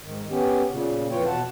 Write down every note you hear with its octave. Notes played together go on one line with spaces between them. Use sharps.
G#2 D#3
B3 C#4 G4
A#2 C#3
F2 E3 F4 C#5 G5
B2 F#5 A5